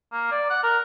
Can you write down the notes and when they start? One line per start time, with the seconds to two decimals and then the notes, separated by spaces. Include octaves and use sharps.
0.13 A#3
0.31 D5
0.50 F#5
0.63 A#4